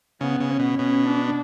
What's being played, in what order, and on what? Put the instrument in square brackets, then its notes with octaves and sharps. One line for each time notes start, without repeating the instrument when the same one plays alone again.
[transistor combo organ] C#3 [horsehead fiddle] B3
[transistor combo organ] C#3
[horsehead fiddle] C#4
[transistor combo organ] B2
[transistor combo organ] B2 [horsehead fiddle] C#4
[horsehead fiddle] D4